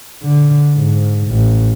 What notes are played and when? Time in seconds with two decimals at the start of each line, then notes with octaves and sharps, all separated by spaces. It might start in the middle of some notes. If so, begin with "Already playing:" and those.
0.23 D3
0.75 G#2
1.28 A1